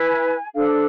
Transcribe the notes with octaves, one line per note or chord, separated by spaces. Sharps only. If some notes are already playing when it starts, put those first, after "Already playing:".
Already playing: E4 B4 G#5
D4 A4 C5 F5
A5